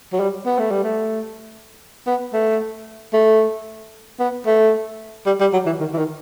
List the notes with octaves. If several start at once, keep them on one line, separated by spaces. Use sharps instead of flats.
F#3
G3
B3
A3
G3
A3
B3
A3
A3
B3
A3
G3
G3
F#3
E3
D#3
E3
D#3